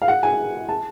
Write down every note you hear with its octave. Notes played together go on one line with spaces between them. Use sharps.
F5
F#5
G#5
A5